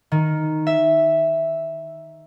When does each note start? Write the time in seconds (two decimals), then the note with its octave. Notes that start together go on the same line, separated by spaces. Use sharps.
0.12 D#3
0.67 E5